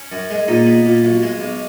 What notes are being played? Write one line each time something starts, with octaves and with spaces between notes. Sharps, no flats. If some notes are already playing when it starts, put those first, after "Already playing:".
Already playing: C#4
F#2
G#3
A#2 D#4
B3
A#2
B1
G#3
B1